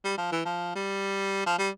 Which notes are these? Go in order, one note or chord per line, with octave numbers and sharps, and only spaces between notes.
G3
F3
E3
F3
G3
F3
G3